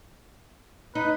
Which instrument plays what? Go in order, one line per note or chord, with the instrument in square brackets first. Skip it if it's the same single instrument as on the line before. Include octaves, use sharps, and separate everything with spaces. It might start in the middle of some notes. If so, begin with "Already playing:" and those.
[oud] D#4 [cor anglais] B4